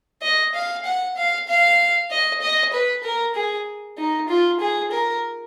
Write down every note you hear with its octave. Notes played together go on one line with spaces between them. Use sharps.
D#5
F5
F#5
F5
F5
D#5
D#5
B4
A#4
G#4
D#4
F4
G#4
A#4